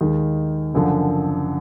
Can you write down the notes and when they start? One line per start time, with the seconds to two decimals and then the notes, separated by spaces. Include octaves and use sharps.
0.01 D#2 D#3 G#3
0.74 F#1 F#2 D3 F3